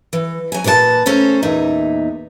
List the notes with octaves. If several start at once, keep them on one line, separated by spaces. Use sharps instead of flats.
E3
F#3 G#5
A#2 F#4 B4 C#5 A5
A3 C#4 A4 C5 A#5
E2 A#2 D#4 E5